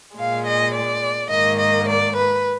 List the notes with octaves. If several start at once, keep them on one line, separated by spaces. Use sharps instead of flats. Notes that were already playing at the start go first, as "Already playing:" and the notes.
A#2 G#3 F5
D#5
D5
G#2 D#3 A#3 D#5
D#5
D5
B4